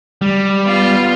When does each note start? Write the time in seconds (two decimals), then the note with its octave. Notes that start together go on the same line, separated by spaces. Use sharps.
0.22 G3
0.64 B3 F4